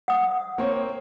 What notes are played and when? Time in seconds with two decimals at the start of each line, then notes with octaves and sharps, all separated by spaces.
0.08 F#5 D#6
0.58 A#3 C4 C#5